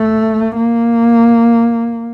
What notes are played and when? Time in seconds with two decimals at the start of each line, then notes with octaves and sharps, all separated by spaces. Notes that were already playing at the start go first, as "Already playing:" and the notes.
Already playing: A3
0.56 A#3